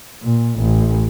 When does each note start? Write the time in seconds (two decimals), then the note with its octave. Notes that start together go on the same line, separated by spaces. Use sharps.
0.24 A#2
0.60 A1